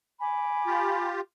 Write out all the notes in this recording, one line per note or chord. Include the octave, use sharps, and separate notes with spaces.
G#5 B5 D6
F4 G4